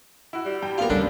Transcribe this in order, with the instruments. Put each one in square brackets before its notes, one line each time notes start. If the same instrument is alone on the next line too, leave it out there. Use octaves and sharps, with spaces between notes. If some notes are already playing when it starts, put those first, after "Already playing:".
[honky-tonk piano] E4 F#4
[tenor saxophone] G3
[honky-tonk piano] G2 G5
[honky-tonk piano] A#3 B3 G4 [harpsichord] F4 A#4
[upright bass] D2 G3 [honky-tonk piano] A2 C#4 [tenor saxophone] D4 [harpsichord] A4